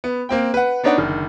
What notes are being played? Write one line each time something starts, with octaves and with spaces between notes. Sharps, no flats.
B3
A#3 C4 G5
B4 F#5
B3 D4 D#4 C#5 D5 F#5
F#1 D3 D#3